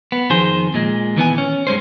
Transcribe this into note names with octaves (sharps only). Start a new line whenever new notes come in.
B3
F2 D#3 G#4 C5
A#2 G#3
D#3 E3 B3 G#5
C#4
G2 G#3 C#4 C5